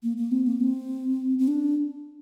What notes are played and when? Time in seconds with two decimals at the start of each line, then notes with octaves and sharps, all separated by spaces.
0.03 A#3
0.17 A#3
0.32 C4
0.47 A#3
0.60 C4
1.39 C4
1.48 D4